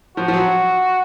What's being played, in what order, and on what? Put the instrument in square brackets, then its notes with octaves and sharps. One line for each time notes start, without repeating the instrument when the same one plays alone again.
[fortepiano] F3 [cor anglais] F#4
[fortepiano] F3
F#3